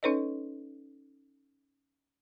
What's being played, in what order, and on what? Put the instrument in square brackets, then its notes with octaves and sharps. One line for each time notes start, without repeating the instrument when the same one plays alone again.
[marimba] C#4 D#4 A4 B4 C#5 D#5